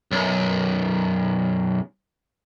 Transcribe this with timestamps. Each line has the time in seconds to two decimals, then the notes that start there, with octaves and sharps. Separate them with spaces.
0.12 B1 F#2